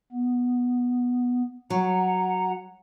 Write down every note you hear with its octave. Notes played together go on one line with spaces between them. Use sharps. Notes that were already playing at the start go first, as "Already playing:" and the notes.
B3
F#3 F#5 A#5